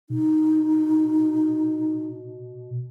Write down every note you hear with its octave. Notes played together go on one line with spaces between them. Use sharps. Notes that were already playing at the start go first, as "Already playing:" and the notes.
B2 D#4